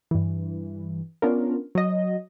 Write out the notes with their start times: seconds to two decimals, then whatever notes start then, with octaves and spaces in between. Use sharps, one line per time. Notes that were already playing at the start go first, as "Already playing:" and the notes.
0.11 G2 E3
1.22 B3 C#4 D4 F4 A#4
1.75 F#3 D#5